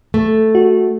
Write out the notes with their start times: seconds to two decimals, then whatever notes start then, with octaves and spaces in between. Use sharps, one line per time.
0.14 A3
0.55 F#4